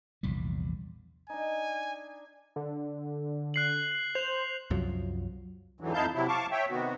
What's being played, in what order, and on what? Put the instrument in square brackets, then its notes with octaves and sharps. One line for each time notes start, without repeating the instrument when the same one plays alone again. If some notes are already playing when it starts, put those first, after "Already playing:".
[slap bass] A#1 E2 C3 G3
[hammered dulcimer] D4 D#4 [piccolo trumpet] G#5
[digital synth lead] D3
[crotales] F#6 C7 F#7
[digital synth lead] C5 [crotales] F7
[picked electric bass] C2 F#2 F3 F#3
[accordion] F2 G#2 D3 E3 F#3
F2 D#4 E4 F5 A5 G6
C3 F#3 E4
F5 A5 C#6 D6
C#5 E5 G5
C3 D#3 B3 F#4